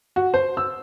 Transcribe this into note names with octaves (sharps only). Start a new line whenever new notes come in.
F#4
C5
E6